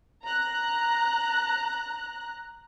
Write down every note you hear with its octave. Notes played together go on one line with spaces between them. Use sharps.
A#5 F#6